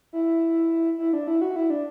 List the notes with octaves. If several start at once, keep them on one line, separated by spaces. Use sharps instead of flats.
E4
E4
D4
E4
F#4
E4
D4